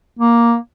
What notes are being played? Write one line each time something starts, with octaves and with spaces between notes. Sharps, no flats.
A#3